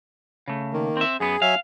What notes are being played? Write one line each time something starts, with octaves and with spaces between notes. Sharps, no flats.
C#3 A3
D#3 A#3
C4 E5
F#2 B3 G#4
F#3 E5 F5 G#5